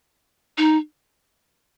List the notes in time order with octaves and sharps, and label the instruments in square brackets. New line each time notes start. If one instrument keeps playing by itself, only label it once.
[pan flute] D#4